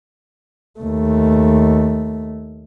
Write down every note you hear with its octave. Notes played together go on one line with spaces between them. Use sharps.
D#2 A3